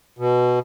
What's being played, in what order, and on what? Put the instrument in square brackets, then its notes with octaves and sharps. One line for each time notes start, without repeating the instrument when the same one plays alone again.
[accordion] B2